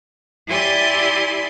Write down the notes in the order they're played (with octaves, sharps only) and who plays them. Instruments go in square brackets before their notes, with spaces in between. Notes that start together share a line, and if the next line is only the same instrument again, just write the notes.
[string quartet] E4 G4 D5 G#5 C6 D#6